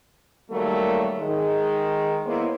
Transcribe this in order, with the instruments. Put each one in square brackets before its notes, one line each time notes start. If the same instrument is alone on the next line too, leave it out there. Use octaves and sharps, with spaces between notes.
[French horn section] D#3 F#3 G3 A3 A#3 A#4
D#3 G#3
A#3 B3 E4 C5 C#5 D#5